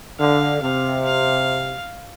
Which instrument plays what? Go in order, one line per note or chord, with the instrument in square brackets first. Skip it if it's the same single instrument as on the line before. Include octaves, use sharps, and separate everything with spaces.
[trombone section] D3 [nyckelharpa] F5
[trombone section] C3 [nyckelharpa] F5
[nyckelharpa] F5